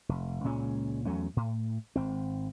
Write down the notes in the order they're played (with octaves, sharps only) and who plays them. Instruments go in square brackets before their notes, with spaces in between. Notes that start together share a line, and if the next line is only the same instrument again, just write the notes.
[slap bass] F1
C#2 A#2 G#3 C#4
E2 F#3 A3 C#4
A2
G#1 C4